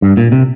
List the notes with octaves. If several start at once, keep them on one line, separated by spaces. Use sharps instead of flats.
G2
A#2
C3